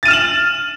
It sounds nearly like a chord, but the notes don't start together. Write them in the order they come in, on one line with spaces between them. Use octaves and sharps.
A6 D#7 F6 E7 F#7